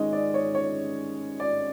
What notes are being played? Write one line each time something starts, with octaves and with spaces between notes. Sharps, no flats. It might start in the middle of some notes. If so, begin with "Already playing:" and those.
Already playing: D#3 G#3 C#4 D#5
D5
C#5
C#5
D5